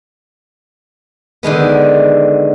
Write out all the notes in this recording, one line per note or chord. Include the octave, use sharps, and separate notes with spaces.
D3 D#3 G#3 B3